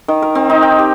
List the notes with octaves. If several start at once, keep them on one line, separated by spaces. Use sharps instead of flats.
D#3
A#4
C4
D#4
G5
G4